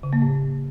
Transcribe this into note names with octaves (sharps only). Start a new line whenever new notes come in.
C#3
A#3
A2